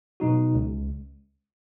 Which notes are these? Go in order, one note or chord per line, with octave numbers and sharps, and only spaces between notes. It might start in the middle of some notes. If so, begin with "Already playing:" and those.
B2 F#3 D#4 F#4
C#2